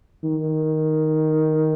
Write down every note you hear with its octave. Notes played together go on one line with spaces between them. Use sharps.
D#3